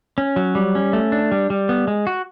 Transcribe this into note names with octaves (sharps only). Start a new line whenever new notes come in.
C#4
F#3
G3
C#4
A3
D4
G3
G3
B3
G#3
F#4